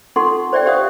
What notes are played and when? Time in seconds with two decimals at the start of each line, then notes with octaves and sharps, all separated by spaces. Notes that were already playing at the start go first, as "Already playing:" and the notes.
0.16 D#4 F4 A4 F#5 C6 C#6
0.53 C5 D5 E5 G5
0.66 G4 C5 F5 F#5 D#6